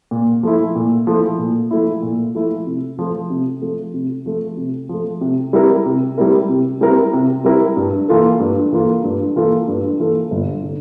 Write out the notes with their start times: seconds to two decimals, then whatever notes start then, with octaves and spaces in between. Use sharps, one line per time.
0.11 A#2
0.43 F3 A3 E4
0.75 A#2
1.07 F3 A3 E4
1.38 A#2
1.71 F3 A3 E4
2.02 A#2
2.35 F3 A3 E4
2.66 C3
2.99 F3 A3
3.30 C3
3.62 F3 A3
3.94 C3
4.26 F3 A3
4.57 C3
4.89 F3 A3
5.21 C3
5.53 G3 C4 E4 A#4
5.86 C3
6.18 G3 C4 E4 A#4
6.49 C3
6.81 G3 C4 E4 A#4
7.13 C3
7.44 G3 C4 E4 A#4
7.77 G2
8.08 E3 A#3 F4 A4
8.40 G2
8.72 E3 A#3 F4 A4
9.04 G2
9.36 E3 A#3 F4 A4
9.68 G2
10.00 E3 A#3 F4 A4
10.31 G1
10.64 D3